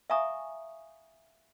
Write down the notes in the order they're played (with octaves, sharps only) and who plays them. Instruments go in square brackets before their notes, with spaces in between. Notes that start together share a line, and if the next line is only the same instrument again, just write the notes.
[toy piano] E5 F5 G#5 A#5 C#6 D#6